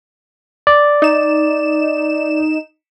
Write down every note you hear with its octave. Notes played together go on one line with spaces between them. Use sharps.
D5
D#4 E7